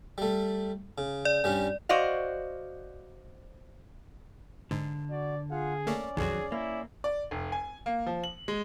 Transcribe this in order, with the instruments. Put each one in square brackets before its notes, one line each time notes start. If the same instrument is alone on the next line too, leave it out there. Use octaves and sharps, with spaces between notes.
[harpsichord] G3 A3
C#3
[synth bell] D5
[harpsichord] G2 G3 C#4
[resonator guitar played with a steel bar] F#4 C5 D5 D#5 F5
[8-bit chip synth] G#2 [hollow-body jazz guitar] D3
[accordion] F#4 [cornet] D5
[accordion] F4 F5 F#5 [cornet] G#4
[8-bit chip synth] A3 A#3 [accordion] C#4 D5
[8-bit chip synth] B1 F2 [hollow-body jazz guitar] D#3 F#3 F#4 [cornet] G#4
[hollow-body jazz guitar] A#3 [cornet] E4
[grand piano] D5
F1
G#5
A#3
F3
F#7
G#3